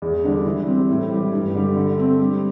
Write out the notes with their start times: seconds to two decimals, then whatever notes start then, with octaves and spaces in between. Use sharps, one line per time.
0.02 E2
0.24 D3 G3 D4
0.45 E3
0.67 G3 C4
0.89 A2
1.11 E3 G3
1.33 G2
1.55 D3 G3
1.76 D3
1.98 A3 C4
2.19 G3